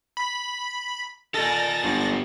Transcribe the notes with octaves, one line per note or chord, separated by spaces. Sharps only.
B5
A#2 A4 A#4 D#5 A6 A#6
G1 F#2